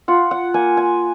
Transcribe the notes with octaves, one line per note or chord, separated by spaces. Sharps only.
F4 F#5
F#5
A#3 G#5
G#5